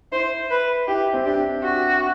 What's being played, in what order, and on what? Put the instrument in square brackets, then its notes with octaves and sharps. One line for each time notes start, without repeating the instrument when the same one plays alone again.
[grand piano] E4 [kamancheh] C5
[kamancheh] B4
[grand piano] E4 [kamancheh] G4
[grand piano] C4
[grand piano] D4 [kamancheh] G4
[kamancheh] F#4